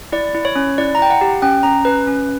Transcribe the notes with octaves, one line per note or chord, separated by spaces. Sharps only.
E4 D5
E4
C#5
C#4
E4 D5
A#5
E4 G5
F#5
G4
C#4 G5
C#4 A#5
C#4 B4
C#4